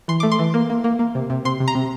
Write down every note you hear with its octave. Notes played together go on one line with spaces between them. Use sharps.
E3 C6
A3 D6
C6
E3
A#3
A#3
A#3
A#3
C3
C3
C3 C6
C3
A#5
C3